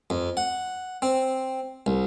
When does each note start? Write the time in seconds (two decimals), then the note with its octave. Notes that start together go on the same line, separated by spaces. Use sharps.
0.10 F2
0.37 F#5
1.02 C4
1.86 C2